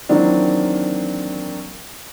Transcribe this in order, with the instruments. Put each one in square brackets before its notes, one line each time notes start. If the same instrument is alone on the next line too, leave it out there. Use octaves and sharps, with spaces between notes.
[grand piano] D#3 E3 F#3 A#3 C4 D4